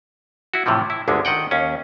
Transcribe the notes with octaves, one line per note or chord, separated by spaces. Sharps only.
E4 F#4
A2 C3 E3 F3
E4
G1 D2 D3 G#3
D#3 D#5 F#5 G5
D#2 C#4